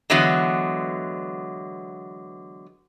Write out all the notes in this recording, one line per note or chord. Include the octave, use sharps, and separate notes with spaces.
D3 E3 F#3 G#3 B3